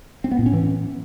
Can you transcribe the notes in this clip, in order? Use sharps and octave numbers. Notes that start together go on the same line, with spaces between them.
C4
B3
A2
C#4
E3